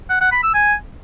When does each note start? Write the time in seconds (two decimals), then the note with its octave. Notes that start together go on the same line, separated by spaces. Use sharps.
0.10 F#5
0.21 F#5
0.32 B5
0.43 E6
0.54 G#5